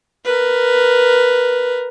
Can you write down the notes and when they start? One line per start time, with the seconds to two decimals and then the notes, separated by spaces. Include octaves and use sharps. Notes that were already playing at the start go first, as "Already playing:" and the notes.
0.25 A#4 B4